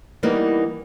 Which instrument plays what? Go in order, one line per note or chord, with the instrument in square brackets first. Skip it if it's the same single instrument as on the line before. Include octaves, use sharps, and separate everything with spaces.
[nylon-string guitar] E3 G3 A#3 B3 D#4